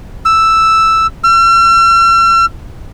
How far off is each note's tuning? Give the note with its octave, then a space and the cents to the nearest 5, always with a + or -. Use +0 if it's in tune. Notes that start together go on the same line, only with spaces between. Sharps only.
E6 +0
E6 +45